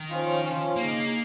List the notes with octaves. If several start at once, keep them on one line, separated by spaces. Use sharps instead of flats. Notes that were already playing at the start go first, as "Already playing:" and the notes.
Already playing: D#3
F3 C#4 F4
F3 C#4 F4
C#3 G#3 A#3 D#4
D#4